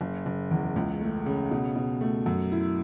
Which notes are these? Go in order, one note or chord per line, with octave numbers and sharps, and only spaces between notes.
F#1
F#1
E2
C#2
A3
C#3
B2
B2
A3
F#2
E4